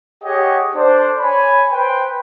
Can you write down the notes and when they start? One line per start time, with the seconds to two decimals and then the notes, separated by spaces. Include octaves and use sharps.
0.23 G4 G#4 C#5 D#5 F#5
0.75 D4 A4 C5
1.20 C#5 G#5 B5
1.71 B4 C5 G5